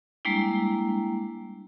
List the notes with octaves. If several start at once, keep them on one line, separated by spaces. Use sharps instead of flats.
G3 G#3 A#3 D4 E4